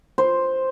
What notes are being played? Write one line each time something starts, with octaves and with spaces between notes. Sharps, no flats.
C5